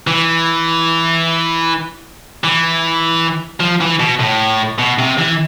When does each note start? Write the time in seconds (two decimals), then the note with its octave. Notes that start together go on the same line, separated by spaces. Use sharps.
0.07 E3
2.44 E3
3.60 F3
3.81 E3
4.00 B2
4.20 A2
4.79 B2
4.99 C3
5.18 E3